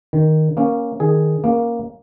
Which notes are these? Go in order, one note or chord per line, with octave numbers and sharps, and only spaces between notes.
D#3
A#3 C#4
D#3 G#4
A#3 C#4